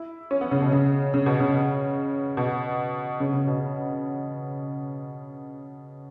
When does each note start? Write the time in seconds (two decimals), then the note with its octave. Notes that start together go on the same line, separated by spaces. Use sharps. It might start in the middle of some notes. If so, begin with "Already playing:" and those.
Already playing: E4
0.31 C#4
0.41 B3
0.51 C#3
0.62 B2
0.72 C#3
1.14 C#3
1.26 B2
1.40 C#3
2.37 B2
3.20 C#3
3.33 C#3
3.47 B2